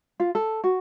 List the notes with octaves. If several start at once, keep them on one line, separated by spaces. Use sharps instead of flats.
F4
A4
F#4